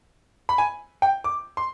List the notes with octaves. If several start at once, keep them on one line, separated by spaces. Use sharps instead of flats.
B5
G#5
G5
D6
C6